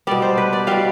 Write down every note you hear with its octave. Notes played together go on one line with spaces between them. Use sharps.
B2 G3 D5
C5
B4
D5
B2 G3 F5